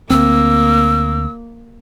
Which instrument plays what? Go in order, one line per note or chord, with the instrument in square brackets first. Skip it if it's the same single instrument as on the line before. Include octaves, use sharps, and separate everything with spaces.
[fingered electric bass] D2 C4 [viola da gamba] A#3 [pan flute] E6